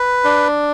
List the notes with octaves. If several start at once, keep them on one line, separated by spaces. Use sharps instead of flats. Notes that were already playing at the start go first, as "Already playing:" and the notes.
Already playing: B4
D4